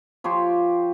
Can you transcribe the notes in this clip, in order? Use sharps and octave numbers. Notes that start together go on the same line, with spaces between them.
F3 G4 C#5 C6